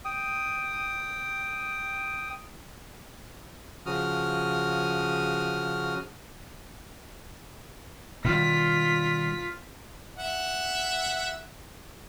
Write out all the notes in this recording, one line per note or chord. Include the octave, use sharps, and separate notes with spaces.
G5 D#6
C#3 F3 F#4 D#6 F6
B2 D#3 G3 F4 B6
E5 F#5